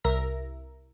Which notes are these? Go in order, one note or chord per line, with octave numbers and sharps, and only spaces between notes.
C2 A#4 E5 A#5 A#6